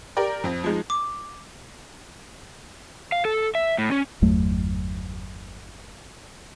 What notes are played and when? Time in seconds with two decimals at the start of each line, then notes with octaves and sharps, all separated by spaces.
0.17 G4 A#4 D5 G5
0.44 F2 C4
0.64 F3 G#3 D#4
0.90 D6
3.12 F5
3.25 A4
3.55 E5
3.78 A2
3.92 C#4
4.22 G1 E2 F#3 A3